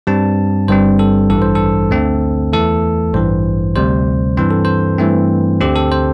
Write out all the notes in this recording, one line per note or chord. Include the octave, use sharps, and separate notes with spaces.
G2 G3 C4 A5
G1 G2 G3 C4 C5
A4
A1 G2 E3 A4
C5
A4
D2 D3 A3 C4
E2 E3 A3 A4
A1 G2 E3 C5
D2 C3 G3 C5
G2 E3 C4 C5
A4
C5
G2 E3 A3 C4
D2 D3 C4 G4
A4
C5